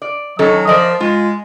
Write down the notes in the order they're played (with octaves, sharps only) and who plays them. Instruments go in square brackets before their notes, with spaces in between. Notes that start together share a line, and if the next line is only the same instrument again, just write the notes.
[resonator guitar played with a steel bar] D5
[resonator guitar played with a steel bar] D#3 C#4 A4 [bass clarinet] F#3
[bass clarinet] F3 [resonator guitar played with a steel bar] A#4 D5 D#5
[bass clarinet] G#3 [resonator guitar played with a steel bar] F4